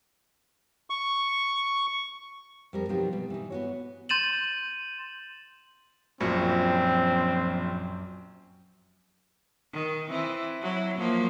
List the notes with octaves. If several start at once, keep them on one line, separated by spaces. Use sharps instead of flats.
C#6
F2 G3 A#4
B2 F3 F#3 C4 D#4 G4
B2 G3
E3 D#4
B3 F#4 C#5
C6 G6 A6 D#7 E7 F#7
A#1 F#2 F3 C4 C#7
D#3
E3 C4
F#3 E4
F3 F#3 A#3